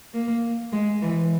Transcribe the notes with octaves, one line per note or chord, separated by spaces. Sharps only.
A#3
G#3
E3